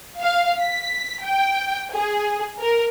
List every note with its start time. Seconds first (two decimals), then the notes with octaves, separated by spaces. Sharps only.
0.20 F5
0.60 B6
1.23 G5
1.92 G#4
2.60 A#4